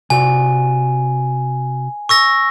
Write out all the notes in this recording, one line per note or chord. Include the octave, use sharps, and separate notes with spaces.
C3 F#4 D5 G#5
C#6 E6 A#6